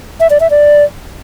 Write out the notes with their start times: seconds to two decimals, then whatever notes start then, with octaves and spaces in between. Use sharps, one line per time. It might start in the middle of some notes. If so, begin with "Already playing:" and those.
0.20 E5
0.30 D5
0.40 E5
0.50 D5